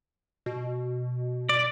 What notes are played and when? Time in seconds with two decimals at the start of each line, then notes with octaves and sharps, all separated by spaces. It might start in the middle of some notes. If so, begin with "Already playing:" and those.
0.46 B2
1.49 D5